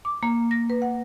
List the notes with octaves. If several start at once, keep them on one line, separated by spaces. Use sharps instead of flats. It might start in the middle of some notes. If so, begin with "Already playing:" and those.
D6
A#3
A#6
B4
F#5